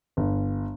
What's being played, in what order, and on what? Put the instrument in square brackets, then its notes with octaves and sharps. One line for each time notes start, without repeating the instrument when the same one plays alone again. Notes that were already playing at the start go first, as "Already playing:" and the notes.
[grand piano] G1